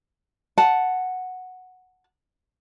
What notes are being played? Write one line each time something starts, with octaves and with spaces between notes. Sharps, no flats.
F#5 A5